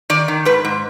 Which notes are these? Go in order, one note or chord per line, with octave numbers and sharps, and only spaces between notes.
D#3 D5
D#3
G#2 B4
G#2